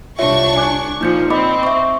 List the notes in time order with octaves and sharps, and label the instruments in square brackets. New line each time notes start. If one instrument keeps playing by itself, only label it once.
[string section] C2 D4 C#6 [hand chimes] F4 C#5 E5
[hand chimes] G#5 D6 F#6
[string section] A#2 F3 [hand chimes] D#4 G6 C#7
[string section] C4 [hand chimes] D#5 B5 D6
[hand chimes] E5 C#6